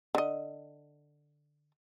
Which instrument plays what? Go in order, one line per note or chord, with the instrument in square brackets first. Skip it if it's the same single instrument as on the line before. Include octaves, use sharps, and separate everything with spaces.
[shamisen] D3 D#5